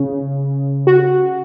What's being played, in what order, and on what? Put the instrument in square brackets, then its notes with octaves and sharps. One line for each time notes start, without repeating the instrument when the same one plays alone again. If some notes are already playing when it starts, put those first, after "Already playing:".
Already playing: [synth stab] C#3
F#4